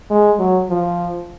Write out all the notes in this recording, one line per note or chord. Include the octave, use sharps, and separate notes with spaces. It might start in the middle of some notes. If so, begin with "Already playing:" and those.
G#3
F#3
F3